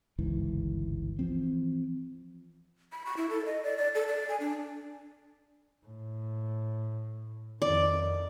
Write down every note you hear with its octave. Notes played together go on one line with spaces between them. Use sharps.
G1 C#2 G#2 E3
E3 F3 C4
B5
C#6
E4
A4
D#5
D5
D5
A4
D5
G#5
D4
A2
F2 D#3 D5